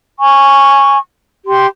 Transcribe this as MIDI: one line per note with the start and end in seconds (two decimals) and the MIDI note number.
0.19 0.98 80
0.19 0.98 85
1.46 1.67 67
1.46 1.67 84